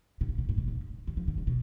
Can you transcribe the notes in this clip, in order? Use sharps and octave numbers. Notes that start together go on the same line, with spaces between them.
B2
C#3
B2
A2
B2
C#3
D3
F3
D3
C#3
B2